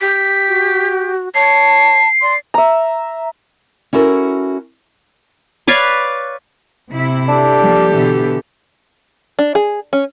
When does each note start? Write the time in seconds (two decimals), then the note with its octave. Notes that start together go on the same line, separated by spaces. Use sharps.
0.01 G4 B6
0.48 F#4
1.35 C#5 A5 C7
2.22 D5 C6
2.54 E5 A#5
3.93 C#4 E4 F#4 A4 A#4
5.67 B4 C#5 D5 F5
6.91 C3 E4
7.28 D4 G4 A4
7.61 F3 G3 A#3
7.93 B2 D3 E3
9.39 D4
9.55 G#4
9.93 C#4